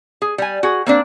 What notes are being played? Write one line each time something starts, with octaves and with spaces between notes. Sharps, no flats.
G#4
G3 G#5
F#4 G#4
A#3 C4 D4